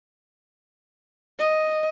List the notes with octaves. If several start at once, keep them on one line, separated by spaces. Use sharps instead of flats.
D#5